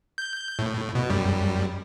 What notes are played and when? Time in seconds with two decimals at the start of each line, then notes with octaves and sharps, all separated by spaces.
0.18 G6
0.59 A2
0.95 B2
1.10 F#2 G3